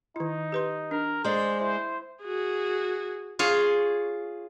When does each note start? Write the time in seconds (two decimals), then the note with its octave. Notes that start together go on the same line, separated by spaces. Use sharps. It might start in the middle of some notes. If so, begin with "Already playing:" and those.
0.16 D#3 D#4 E4
0.52 G4 B4 C6
0.91 D4 A#4
1.24 G#3 C5 D5
1.60 E4 C5
2.23 F#4 G#4
3.39 F4 G#4 C#5